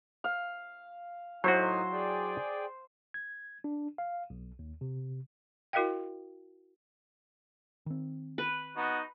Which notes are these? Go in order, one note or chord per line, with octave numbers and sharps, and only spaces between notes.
F5
A2 F#3 D#4 E4 F#4 C5 G#5
G#4 D5 G5
G#6
D4
F5
B1
D#2
C3
E4 F#4 A#4 D#5 F5 G5
D#3 C4
B4
B3 D#4 F#4